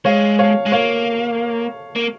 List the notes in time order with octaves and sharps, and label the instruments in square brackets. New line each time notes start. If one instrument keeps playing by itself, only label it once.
[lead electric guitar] G#3 [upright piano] C#5 F5
[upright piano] C#5 F5
[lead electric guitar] G#3
[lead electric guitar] A#3 [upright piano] C#5 F5
[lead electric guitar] A#3